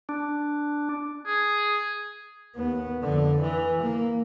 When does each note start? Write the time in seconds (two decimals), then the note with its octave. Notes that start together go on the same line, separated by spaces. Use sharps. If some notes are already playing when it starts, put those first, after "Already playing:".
0.09 D4
1.27 G#4
2.55 D#2 B3
3.01 F2 D3
3.41 E3
3.82 A#3